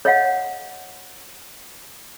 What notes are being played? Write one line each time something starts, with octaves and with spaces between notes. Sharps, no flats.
C#5 D#5 F5 F#5